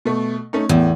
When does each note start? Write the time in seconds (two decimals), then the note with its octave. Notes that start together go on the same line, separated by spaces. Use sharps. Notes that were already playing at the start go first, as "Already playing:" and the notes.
0.05 B2 A3
0.53 A3 C#4 D#4
0.69 E2 A2